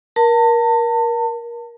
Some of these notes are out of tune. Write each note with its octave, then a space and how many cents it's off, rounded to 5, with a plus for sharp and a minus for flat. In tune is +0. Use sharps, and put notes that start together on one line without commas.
A#4 +25 A5 +35